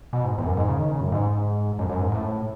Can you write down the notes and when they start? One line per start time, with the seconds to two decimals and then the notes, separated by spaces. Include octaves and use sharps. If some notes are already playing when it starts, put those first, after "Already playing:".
0.13 B2
0.24 G#2
0.38 E2
0.47 F#2
0.57 G#2
0.69 C#3
0.79 D#3
0.91 C#3
1.01 F#2
1.08 A2
1.12 G#2
1.79 F#2
1.89 F#2
2.01 G#2
2.12 A2